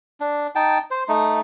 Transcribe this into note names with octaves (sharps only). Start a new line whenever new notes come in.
D4
D#4 G5 A5
C5
A3 D#4